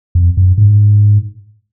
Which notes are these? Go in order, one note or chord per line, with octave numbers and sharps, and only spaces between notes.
F2
F#2
G#2